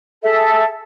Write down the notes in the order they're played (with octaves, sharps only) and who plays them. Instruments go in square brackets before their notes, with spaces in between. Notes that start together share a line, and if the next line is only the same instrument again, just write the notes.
[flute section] G#4 A4 E5